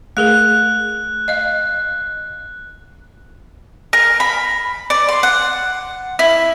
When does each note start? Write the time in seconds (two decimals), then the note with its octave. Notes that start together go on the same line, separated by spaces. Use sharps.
0.17 A3 G#4 A#4 F#6
1.28 D#5 F5
3.93 A#4
4.20 B5
4.90 D5
5.09 C6
5.23 F#5
6.19 E4